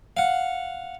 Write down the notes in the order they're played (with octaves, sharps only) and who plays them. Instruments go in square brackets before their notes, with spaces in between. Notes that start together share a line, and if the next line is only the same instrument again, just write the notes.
[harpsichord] F5 F#5